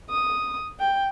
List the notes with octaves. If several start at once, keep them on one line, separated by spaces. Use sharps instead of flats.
D#6
G5